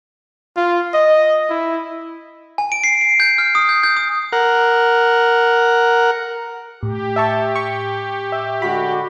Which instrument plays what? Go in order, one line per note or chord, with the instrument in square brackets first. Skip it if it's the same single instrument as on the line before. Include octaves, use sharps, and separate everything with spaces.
[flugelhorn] F4
D#5
E4
[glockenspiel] G#5
D7
C7
D7
G6
F6
D#6
G6
G6
D#6
[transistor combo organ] A#4 F#5
[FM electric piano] A2 [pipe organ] G4
[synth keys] E5 A5 C#6
C#6
E5
[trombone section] D3 G#3 F#4 [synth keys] B5